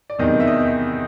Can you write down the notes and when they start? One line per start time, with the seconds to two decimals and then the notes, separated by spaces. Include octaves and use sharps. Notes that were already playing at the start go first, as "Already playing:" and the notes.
0.10 D5
0.19 E2 C3 D#3 D#5
0.40 E5
0.47 D#5